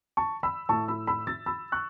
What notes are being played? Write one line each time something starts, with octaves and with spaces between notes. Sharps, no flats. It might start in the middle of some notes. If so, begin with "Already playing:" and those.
A5 C#6
B5 E6
A2 A3 E4 A5 C#6
B5 E6
B5 E6
E6 A6
B5 E6
C#6 F#6